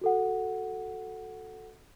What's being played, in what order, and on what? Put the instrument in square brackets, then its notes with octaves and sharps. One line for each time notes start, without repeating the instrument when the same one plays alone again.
[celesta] F#4 A4 F#5